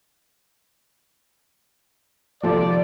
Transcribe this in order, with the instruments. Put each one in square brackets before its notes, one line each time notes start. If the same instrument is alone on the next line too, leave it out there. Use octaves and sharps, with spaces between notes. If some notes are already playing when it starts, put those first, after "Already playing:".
[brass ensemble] G#1 C3 D5 [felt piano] F3 A4